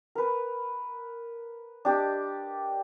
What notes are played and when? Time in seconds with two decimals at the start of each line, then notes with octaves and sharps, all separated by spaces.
0.15 A#4 B4
1.85 D4 G4 D#5